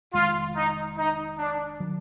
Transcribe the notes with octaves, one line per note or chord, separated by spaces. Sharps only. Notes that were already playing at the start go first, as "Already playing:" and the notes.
F1 F2 D#3 G#3 F4
D#4
D#4
D4
D#3 F#3